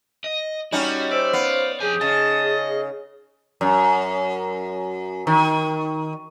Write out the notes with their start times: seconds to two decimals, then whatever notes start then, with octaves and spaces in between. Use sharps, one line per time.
0.24 D#5
0.72 G3 C#4 D#4 F#4
1.11 C5 D5 E5
1.33 B3 F5
1.80 F2 G4 G#4 G#5
2.01 C#3 D#5 A5
3.61 F#2
5.27 D#3